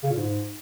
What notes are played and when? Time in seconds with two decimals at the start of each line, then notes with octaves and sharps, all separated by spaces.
0.03 C#3
0.10 A#2
0.17 G#2